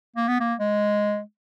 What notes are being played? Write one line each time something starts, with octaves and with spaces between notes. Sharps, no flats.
A#3
B3
A#3
G#3